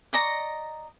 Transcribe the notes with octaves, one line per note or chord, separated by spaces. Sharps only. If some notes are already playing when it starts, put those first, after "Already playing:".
D5 D#5 A#5 C#6